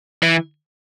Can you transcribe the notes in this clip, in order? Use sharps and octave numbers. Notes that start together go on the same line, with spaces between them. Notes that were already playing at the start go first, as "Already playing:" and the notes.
E3